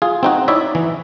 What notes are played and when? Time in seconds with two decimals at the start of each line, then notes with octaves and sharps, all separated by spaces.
0.02 F4 G#4
0.23 C4 D#4 F#4
0.48 D#4 E4 C#5 D5 E5
0.75 E3